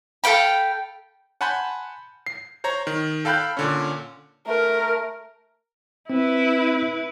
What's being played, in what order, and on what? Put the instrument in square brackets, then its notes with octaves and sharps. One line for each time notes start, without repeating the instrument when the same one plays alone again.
[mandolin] A4 F5 G5 B5
[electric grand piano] F#5 G#5 A5 B5 C6 G6
C7
C5 C#5 A#5
D#3
A4 F5 G5 B5 F#6 G6
A#2 D3 C#4
[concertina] A3 [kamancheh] A#4
[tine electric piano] C4 [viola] E4 B4